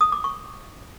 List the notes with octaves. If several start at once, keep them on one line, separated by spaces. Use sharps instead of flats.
D#6
D6
C#6